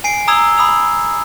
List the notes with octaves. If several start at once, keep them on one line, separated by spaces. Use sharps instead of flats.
G#5 C7 D7
A#5 D#6 E6 G#6 F7 G7
B5 D#6 E6 F7